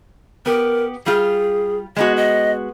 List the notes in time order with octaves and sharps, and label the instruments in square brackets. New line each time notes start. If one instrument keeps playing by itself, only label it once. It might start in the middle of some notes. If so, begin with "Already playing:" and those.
[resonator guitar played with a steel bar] B3 G4 [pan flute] A#4
[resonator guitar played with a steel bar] G3 F4 [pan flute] G#4
[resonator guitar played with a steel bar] G#3 B3 F#4 [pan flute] D#5
[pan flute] D#5